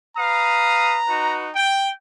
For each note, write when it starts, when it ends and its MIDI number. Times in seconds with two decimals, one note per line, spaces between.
0.16 1.00 71
0.16 1.00 77
0.16 1.38 82
0.16 1.00 87
1.08 1.49 63
1.08 1.49 66
1.08 1.49 71
1.55 1.91 79